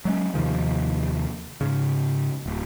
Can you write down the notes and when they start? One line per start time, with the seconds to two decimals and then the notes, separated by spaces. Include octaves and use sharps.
0.05 F#3 G#3 C#4
0.34 D#2 C3 D#3 F3
1.61 G#2 C#3
2.46 D1